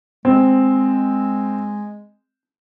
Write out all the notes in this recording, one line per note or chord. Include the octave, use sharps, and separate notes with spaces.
G#3 C4